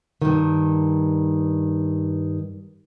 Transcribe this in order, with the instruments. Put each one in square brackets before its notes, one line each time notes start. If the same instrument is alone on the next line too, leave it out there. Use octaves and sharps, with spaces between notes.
[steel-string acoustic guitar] G2 D#3